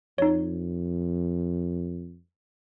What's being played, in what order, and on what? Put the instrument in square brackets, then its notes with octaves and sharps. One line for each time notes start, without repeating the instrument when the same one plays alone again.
[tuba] F2 [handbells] D#4 C#5